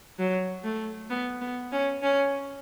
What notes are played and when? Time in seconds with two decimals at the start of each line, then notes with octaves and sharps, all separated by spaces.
0.19 F#3
0.64 A3
1.10 B3
1.41 B3
1.72 C#4
2.02 C#4